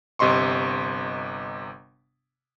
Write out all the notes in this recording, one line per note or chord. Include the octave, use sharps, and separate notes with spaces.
G1 C3 D#5 C6 C#6